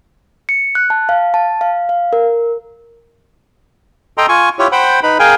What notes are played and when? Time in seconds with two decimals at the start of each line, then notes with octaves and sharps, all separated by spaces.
0.49 C#7
0.75 F#6
0.90 A5
1.09 F5
1.34 A5
1.61 F5
1.89 F5
2.13 A#4
4.18 A4 D#5 G5 A#5 C6
4.29 F4 G#5 C#6
4.59 E4 F4 G4 C#5
4.72 C5 F#5 G5 B5
5.03 D#4 B4 B5
5.19 G#4 A#4 F5 G5 G#5